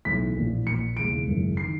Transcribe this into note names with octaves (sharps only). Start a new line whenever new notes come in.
B1 A2 E3 B6
A#1 A2 E3
A#1 A#2 C#7
E1 D#2 C#3 E3 D7
G#1 F#2 C#3 E3
D#3 C7